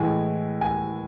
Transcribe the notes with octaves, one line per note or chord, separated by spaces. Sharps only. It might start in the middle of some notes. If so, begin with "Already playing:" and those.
Already playing: A2 E3 G#3 G#5
G#5